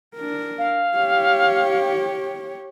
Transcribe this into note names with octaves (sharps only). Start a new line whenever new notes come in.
D4 A#4
F5
G4 C#5